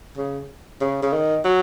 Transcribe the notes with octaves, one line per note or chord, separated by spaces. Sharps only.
C#3
C#3
C#3
D#3
F#3